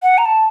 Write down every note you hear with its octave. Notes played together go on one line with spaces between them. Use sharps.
F#5
A#5
A5